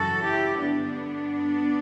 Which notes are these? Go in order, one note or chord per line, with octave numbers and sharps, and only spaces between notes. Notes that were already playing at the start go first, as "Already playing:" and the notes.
Already playing: F#2 C#3 E3 F#4 A4
E4 G4
G2 D3 B3 D4